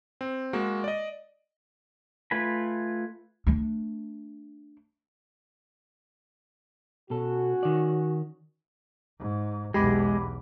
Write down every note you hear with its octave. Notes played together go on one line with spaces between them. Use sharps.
C4
G#3 A#3 F#4
D5 D#5
A3 F4 B4 G#5 B5
A3 D4
B2 C#4 F#4 A4
D#3 D5
G#2
B1 E2 G#3 G4 B5 D6